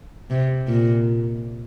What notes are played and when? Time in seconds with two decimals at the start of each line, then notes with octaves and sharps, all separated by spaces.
0.30 C3
0.68 A#2